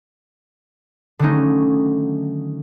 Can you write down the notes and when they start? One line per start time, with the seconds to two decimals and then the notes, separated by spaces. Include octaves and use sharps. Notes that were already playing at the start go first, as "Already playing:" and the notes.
1.19 D3 D#3 F#3 A3 C#4 D#4